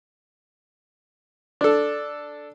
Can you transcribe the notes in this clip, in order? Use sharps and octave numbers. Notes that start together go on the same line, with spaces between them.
D4 A4